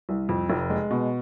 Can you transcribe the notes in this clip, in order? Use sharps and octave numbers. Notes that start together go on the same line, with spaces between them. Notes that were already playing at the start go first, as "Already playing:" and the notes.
C2
F2
F1
G#3
B2